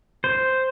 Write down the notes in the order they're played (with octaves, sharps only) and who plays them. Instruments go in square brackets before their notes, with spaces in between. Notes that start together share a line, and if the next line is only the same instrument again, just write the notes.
[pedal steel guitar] C5